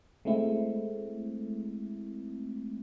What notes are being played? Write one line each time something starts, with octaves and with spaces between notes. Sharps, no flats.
G#3 A3 C4 E4